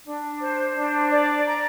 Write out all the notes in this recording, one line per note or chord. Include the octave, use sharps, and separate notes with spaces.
D4
C5
D4
D5
A#5